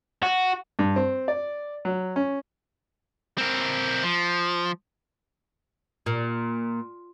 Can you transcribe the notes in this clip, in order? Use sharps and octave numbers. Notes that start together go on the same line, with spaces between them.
F#4
G2
C4
D5
F#3
C#4
C4 A#4
F3
A#2